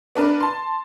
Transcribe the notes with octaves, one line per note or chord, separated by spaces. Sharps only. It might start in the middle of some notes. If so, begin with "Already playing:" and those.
B3 D4 A#4 B4
A5 C6